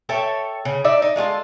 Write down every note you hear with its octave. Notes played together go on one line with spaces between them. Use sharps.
A4 C#5 E5 G5
C#3
D#4 D5 E5
D#4
G#3 F4 F#4 A4